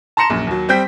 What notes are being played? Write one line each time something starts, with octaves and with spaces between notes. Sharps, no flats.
A5 A#5 C6 A#6 C#7 E7
A#1 F#2
D#2 F#3
G3 C4 G5 G6 B6